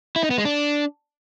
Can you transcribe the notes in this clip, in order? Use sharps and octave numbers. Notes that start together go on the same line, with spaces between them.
E4
D#4
B3
G#3
D4